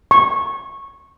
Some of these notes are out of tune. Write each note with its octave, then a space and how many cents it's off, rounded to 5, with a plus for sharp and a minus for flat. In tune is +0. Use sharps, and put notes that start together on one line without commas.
C#6 -15